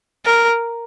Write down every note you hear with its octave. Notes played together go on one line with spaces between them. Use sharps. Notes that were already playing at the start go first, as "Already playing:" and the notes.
A#4